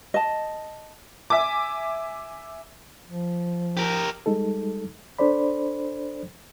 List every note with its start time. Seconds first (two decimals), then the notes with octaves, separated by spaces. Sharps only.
0.14 D#5 A5
1.30 E5 G#5 D6
3.07 F3
3.77 G4 A#4
4.26 G3 G#3 D#4 A4
5.19 D4 A4 C5 D5 B5